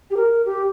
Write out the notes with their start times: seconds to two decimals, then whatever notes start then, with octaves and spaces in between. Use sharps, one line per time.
0.11 G4
0.17 A#4
0.45 G4